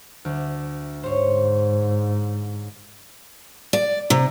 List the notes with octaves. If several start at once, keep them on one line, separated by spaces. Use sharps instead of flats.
D2
G#2 C5 C#5
D5
C3